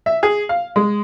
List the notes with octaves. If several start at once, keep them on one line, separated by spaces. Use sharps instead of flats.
E5
G#4
F5
G#3